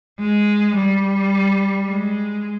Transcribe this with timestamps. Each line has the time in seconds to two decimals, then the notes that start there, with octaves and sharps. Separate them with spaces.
0.20 G#3
0.76 G3
1.87 G#3